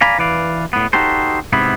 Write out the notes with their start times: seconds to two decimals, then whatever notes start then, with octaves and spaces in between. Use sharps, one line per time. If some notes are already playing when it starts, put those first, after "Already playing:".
0.01 D5 F5 G#5 A#5 B5
0.18 E3 B4 D5 F5
0.73 A2 B3
0.93 D#4 F#4 G4 A4 C5
1.53 G#2 C3 B3 E4